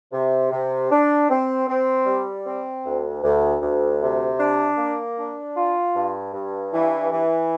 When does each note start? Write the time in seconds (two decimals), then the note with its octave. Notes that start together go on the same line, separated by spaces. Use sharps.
0.12 C3
0.51 C3
0.90 D4
1.29 C4
1.67 C4
2.06 G3
2.46 C4
2.85 D2
3.23 D2
3.62 D2
4.01 C3
4.40 D4
4.78 A#3
5.18 D4
5.57 F4
5.95 G2
6.33 G2
6.72 E3
7.11 E3